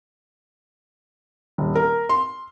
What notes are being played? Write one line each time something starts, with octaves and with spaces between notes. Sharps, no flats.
D#1
A#4
C6